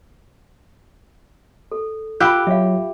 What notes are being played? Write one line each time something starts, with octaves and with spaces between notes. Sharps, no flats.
A4
F4 G4 F5 B5 E6 F#6
F#3 E5 F5